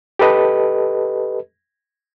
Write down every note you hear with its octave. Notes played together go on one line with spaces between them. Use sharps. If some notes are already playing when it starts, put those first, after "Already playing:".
G4 A4 B4 D#5